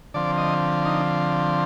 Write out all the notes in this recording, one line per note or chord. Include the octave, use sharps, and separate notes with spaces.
D3 F3 C4 D5
D#5
D#4